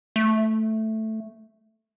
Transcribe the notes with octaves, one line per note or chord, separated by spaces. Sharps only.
A3